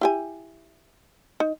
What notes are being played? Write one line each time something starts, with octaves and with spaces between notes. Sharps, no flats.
E4 G4 G#5
D#4